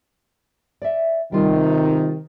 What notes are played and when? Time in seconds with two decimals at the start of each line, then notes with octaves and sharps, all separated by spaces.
0.82 D5 E5
1.32 C3 D#3 G3 F4